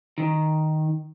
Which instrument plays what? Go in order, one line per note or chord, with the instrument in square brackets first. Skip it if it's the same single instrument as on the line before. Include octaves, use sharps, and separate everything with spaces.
[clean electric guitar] D#3